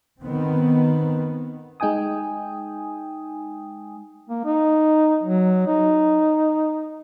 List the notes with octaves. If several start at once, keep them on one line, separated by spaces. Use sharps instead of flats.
D#3 B3 C4
G#3 D#4 G5 G#5 D#6
A#3
D#4
F#3
D#4